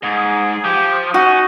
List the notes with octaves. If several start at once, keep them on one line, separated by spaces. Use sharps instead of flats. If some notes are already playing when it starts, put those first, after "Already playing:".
G#2 G#4
F3 G4
C#4 D#4 F#4